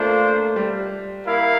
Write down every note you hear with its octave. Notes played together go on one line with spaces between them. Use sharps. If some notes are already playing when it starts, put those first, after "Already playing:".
Already playing: A3 A#3 D4 F4 C5
G3
A#3 E4 A#4 F5